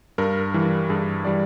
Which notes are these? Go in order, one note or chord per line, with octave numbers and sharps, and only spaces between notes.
G2 A#4
E3 G3
G2 G#4
E3 G3 D5